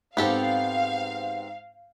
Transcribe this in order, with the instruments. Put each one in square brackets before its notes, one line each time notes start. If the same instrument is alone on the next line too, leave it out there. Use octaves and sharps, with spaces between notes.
[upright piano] G#2 C4 [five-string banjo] B3 G4 A4 [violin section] F5